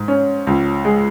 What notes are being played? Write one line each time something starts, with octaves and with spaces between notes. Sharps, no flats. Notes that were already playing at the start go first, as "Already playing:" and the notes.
Already playing: G#2
C#4
C#2
G#3